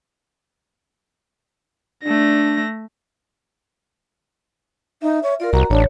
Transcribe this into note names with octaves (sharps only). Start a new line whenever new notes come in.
A3 D4 A#6
D#4 E5
C#5
F4 A#4 D5
C2 F#4 A#5
A1 D4 C#5